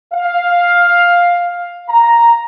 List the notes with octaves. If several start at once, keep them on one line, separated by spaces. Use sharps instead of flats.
F5
A#5